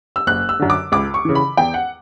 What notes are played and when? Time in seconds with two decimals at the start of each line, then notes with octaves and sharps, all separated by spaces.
0.16 E6
0.27 F#1 F#6
0.49 E6
0.59 F#2 D3
0.70 D6
0.92 C#2 D6
1.14 C#6
1.25 C#3 E3
1.35 B5
1.57 E2 G5
1.74 F#5